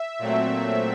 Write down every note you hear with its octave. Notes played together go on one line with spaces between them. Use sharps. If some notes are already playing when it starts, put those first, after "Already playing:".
Already playing: E5
A#2 F#3 A3 C4